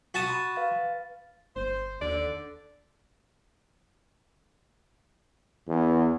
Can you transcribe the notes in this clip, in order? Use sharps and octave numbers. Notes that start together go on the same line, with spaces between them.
F#4 A5 D#6
B5 C6
B4 F5 A6
G1 C5
D#2 D3 D5
E2